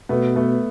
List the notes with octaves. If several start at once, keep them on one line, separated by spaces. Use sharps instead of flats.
B2 A3 B3
A3 B3